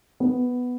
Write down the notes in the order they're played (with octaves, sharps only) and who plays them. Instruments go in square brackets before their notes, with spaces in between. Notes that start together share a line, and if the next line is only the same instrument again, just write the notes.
[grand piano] B3